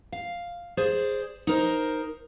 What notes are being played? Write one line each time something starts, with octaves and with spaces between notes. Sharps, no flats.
F5
G#4 C5 D5
D#4 A#4 C5